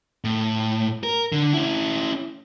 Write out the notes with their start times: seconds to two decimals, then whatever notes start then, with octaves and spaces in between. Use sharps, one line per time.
0.24 A2
1.03 A#4
1.32 D3
1.53 C#4 E4